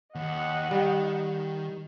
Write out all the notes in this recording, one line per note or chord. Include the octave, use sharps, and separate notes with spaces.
D#2 D#5 F#5
D#3 G3